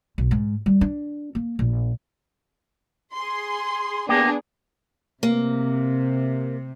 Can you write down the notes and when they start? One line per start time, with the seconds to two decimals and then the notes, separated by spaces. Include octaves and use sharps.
0.18 B1
0.31 G#2
0.66 G3
0.81 D4
1.35 A#3
1.59 A#1
3.15 G#4 C6
4.09 A#3 B3 D4 G4 G#4
5.23 C3 A#3